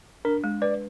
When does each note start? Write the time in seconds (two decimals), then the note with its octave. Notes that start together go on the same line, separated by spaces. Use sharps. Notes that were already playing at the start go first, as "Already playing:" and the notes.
0.25 D4 A#4
0.44 G#3
0.62 B4 D5